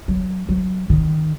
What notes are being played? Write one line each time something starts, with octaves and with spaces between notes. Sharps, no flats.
F#3
F#3
D#3